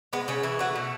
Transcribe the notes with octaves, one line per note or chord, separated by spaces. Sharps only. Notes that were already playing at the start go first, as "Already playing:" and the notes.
G#3 B3
C#3 C#4
E3 E4
A3 F#4
B2